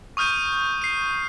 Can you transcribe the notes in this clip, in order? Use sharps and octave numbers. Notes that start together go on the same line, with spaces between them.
C#6 D#6 F6 G6 D#7
C7 D#7